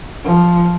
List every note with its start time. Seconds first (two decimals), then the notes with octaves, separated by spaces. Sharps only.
0.25 F3